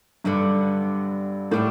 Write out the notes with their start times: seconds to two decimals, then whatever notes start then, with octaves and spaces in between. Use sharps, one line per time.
0.24 G2 D3 G3 B3
1.51 A2 G3 D4 A4